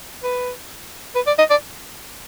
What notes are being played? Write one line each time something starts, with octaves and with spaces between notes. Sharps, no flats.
B4
B4
D5
D#5
D5